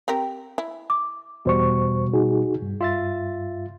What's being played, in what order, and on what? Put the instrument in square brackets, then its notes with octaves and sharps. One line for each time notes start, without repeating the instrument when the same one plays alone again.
[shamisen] C4 G4 A#4
E4
[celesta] D6
[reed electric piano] E2 C5 C#6 [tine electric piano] B2 G3
[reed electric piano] D#4 F#4 G#4
G2
[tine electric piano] F4 E5 A6